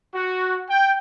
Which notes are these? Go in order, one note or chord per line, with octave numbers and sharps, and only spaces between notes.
F#4
G5